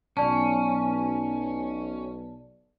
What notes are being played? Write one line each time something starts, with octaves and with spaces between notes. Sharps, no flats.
B1 C#4 D5 A5